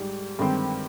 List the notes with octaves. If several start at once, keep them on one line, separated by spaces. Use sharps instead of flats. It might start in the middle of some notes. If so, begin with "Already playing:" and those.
Already playing: G#2 G3
G2 D#3 G#3 C4